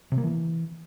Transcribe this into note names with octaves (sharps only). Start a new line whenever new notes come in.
C3
A#3
E3